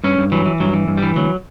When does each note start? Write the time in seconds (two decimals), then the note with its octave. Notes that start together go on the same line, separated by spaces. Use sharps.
0.04 G2 C#4
0.18 G2
0.32 E3 F#3
0.46 E3
0.60 G2 F#3
0.73 E3
0.88 G2
0.97 G3
1.03 E3
1.16 D2 F#3